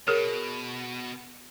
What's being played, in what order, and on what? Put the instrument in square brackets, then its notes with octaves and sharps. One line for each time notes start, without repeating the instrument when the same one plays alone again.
[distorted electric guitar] B2 [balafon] G#4 A#4 C#5